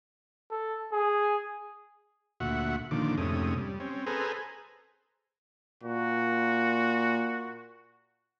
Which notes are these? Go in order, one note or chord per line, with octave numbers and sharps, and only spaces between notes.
A4
G#4
D2 A#2 F#4 E5 F#5
A#2 D3 D#3 F3 D6
F2 G#2 C3 A3 C#4 D#6
G3
C4 C#4
G#4 A4 B4 C5 G#5 A#5
A#2 F#4